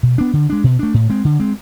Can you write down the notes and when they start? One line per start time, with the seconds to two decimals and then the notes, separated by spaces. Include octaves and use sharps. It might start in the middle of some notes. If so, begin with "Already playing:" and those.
0.03 B2
0.18 B3 D4
0.33 D3
0.50 G#3 D4
0.64 B2
0.79 A3 D4
0.94 A2
1.10 G#3 C4
1.25 D3
1.40 G#3 C4